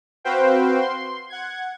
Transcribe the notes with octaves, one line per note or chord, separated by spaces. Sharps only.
C4 F#4 B4 C5 F5 G5
C6
F#5 G#6